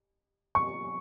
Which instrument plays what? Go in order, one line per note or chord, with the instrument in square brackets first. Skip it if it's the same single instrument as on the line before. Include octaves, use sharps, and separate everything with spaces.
[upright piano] C#6